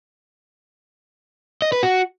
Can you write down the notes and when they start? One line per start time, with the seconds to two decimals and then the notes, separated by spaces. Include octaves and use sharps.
1.62 D#5
1.72 B4
1.83 F#4